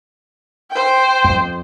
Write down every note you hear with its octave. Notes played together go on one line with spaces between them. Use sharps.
C5 G5
F2